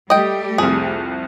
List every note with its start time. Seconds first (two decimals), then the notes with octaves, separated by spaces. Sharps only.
0.10 G3 A3 G4 D#5 G5
0.58 C2 F2 G#4